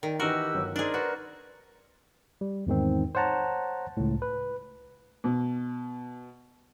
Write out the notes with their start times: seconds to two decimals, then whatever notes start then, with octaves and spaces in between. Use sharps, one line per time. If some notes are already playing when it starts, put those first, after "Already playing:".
0.03 D#3 D5 G5
0.20 E3 D#4 F#4 G4 A#4 B4 E6
0.54 G1 F#3
0.76 D4 D#4 G#4 A#4 C5 D5
0.94 F#4 B4
2.41 G3
2.67 E2 G#2 D#3 C4
3.15 C5 C#5 F#5 A5 A#5
3.97 C#2 A2
4.22 B4
5.24 B2